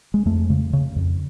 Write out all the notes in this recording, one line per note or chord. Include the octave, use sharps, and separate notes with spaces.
G#3
F2 A3
C#3
C#3
F2